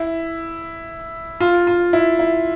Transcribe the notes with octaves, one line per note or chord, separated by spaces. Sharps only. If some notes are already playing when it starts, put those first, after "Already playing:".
Already playing: E4
F4
F4
E4
E4